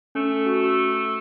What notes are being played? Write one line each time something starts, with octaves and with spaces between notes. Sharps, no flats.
A3 C#4
F#4